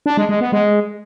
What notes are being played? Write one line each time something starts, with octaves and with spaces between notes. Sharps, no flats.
D4
G#3
G#3
B3
G#3